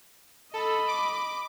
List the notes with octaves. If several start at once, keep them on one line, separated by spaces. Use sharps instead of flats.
A4 D#5 B5
D6